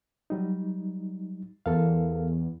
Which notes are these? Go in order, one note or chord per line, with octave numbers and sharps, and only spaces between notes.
F#3 G3 D#4
E2 A4 A#4 F5